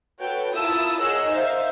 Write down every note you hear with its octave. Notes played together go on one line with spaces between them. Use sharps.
F#4 A4 B4 C#5 G5
E4 F4 A#4 A5 D#6 E6
G#4 A#4 C#5 D#5 F#5 E6
D#4 C5 E5 F5